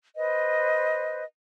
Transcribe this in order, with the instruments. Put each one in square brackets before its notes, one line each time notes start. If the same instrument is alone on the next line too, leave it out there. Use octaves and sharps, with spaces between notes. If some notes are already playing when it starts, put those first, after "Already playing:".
[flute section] B4 C5 D#5